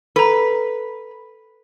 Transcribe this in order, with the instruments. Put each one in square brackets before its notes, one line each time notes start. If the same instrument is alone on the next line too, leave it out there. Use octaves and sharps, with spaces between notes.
[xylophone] A4 A#5 [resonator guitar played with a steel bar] B4